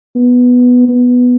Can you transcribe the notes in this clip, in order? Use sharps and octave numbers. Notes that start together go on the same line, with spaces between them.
B3
B3